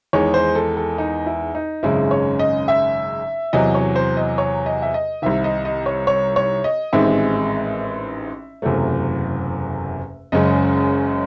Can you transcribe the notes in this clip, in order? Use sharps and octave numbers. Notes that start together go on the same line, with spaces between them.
E2 D#3 G#3 C#5
C5
A4
A4
D#4
E4
D#4
G#1 F#2 C#3 G#3 C#4 E4
C#5
D#5
E5
E2 C3 F#3 D#5
C#5
C5
D#5
C#5
D#5
E5
D#5
C2 C3 D#3 E5
D#5
D#5
C#5
C#5
C#5
D#5
A1 G#2 D#3 G#3 C4 E5
F#1 E2 C3 F#3 A3
F#1 F#2 C#3 G#3 C#4 D#5